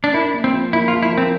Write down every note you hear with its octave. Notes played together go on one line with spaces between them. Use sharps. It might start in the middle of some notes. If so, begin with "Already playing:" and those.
D4
E4 A#4
A#3
C4
F3
A#3 E4
F4
F3
E4
C4 A#4